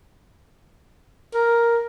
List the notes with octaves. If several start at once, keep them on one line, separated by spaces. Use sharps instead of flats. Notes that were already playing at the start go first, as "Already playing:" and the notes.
A#4